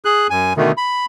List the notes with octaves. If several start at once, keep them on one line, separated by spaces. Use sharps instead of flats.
G#4 F#6
F#2 G#5
B2 D3 D#3 A3
B5